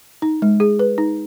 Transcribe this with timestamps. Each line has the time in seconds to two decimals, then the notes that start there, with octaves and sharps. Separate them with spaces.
0.22 D#4
0.42 G#3
0.60 G#4
0.79 B4
0.98 D#4